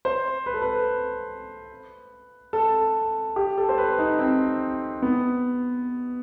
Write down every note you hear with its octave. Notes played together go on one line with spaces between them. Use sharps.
C5
B4
A4
B4
A4
G4
A4
C5
B4
D#4
C4
B3